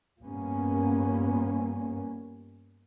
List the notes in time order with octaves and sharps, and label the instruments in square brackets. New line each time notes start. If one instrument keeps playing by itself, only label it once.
[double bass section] G2 F3 G3 A#3 B3 C#4